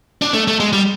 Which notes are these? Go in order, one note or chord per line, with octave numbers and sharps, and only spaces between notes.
D4
A3
A3
G#3
G3